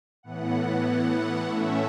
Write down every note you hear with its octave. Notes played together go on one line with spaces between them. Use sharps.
A2 E3 B3 F#5
A2 A3 C#4 E5